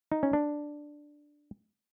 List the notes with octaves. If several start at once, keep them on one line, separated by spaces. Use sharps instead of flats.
D#4
C#4
D4